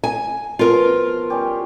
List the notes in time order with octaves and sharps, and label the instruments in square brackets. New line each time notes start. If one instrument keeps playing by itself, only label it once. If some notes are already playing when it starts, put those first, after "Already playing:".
[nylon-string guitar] G#5
[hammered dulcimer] B2 F3 [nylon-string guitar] F4 A#4
[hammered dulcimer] G3 C#4 G4